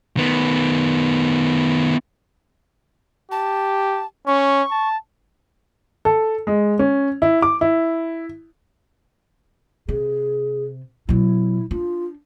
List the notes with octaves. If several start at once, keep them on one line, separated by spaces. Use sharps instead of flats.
D#3 B3
G4 A5
C#4 C#6
A5
A4
G#3
C#4
E4
D6
E4
C3 G#4
B2 F#3 E4
D4 F4